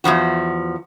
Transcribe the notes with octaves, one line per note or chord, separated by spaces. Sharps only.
E2 G#2 F3 F#4